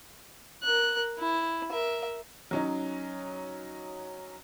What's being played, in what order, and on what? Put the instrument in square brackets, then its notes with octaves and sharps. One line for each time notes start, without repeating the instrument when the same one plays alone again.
[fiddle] A#4 F#6
E4
A#4 E5
[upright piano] F#3 C#4 D#4